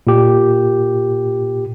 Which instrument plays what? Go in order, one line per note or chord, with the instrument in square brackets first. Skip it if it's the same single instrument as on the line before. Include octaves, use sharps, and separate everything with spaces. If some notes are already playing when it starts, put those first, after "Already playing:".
[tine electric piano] A#2 G4